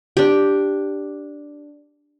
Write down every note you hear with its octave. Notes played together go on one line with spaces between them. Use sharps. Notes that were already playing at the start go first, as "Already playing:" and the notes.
D4 G4